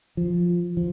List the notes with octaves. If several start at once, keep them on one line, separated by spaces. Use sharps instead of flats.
F3
F3